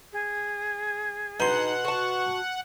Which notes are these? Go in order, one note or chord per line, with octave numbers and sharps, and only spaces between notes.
G#4
B2 D#4 F#5 C6
F#4 A5 C#6